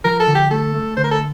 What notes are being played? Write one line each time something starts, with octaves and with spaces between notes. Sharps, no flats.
F3 A#4
A4
D3
G4
A3 A4
A3
D3 C5
A#4
A4